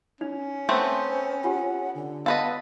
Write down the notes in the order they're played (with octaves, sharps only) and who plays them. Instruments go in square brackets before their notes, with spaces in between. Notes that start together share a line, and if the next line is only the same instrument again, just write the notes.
[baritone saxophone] C#4 [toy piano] D#4
[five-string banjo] A3 B3 C4 [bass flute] C5
[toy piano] F4 G4 [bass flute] F#5
[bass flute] D3
[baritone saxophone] B3 [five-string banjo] A4 B4 D#5 [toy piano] F5